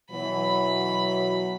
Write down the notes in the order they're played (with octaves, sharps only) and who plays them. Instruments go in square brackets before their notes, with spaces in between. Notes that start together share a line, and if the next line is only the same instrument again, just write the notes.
[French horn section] B2 E3 F#3 [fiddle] B5